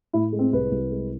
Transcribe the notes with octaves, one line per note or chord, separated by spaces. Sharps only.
A2 E4
G#3
C4
C2 B4
C2
G#3